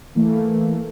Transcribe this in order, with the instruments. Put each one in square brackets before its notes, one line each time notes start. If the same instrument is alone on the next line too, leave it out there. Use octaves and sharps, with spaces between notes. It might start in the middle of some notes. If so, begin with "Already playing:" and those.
[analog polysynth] E3 A3 A#3